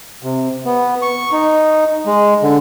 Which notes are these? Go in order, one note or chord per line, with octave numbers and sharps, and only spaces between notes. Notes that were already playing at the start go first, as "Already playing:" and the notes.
C3
B3
C#6
D#4
G#3
D3